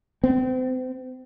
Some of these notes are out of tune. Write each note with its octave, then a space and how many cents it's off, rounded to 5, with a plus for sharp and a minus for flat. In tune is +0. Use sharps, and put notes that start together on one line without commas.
C4 -35